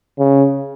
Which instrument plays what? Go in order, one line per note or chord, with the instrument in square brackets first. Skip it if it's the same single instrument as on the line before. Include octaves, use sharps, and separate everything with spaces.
[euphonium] C#3